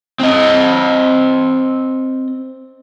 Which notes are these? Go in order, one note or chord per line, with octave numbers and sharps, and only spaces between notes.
C4 D#5